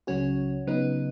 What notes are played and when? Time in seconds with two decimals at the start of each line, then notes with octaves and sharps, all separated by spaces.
0.07 C#2 C#3 F#3 C#4 F#4 C#5
0.67 C#3 F#3 B3 D#4 B4